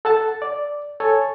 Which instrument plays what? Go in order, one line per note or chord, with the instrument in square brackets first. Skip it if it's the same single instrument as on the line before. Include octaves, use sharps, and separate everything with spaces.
[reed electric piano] A4 F#5 A5
D5
A4 C#5 G#5